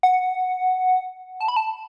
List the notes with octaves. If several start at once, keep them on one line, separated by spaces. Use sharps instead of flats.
F#5
A5
B5
A5